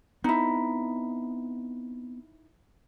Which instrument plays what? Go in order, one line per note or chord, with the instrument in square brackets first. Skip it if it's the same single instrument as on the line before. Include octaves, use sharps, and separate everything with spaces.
[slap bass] B3 C4 [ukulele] D#4 E4